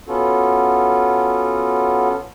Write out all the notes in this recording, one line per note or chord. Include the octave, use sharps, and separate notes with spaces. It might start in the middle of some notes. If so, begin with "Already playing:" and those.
B3 C#4 F4 F#4 A4